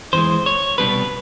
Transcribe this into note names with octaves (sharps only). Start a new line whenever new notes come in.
E2 C#3 E3 G#3 C5
C#5
C2 B2 G3 B3 D4 B4